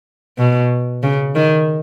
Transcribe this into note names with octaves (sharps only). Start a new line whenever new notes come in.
B2
C#3
D#3